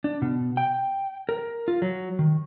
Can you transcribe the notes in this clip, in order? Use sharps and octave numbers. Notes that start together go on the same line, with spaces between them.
D4
B2
G5
A#4
F4
F#3
D#3